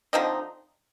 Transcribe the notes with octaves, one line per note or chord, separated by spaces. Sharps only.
D3 F3 C4 D#4